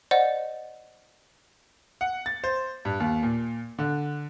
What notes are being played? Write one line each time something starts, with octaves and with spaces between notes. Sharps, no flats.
C5 D5 D#5 F#5
F#5
A6
C5
G2
D#2
A#2
D3